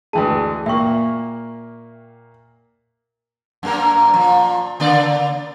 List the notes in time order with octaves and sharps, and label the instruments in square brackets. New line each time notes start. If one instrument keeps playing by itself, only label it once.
[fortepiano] D2 E3 G#3 [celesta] G5 A5
[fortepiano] A#2 A#3 [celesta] E5 G5 C#6
[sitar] F#2 A#3 A#4
A#2 F3
C#3 A#3 D5